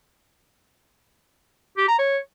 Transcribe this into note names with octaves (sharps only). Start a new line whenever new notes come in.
G4
A#5
C#5